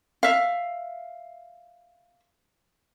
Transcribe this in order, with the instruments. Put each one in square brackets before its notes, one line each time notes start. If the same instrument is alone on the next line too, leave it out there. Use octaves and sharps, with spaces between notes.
[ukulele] E5 F5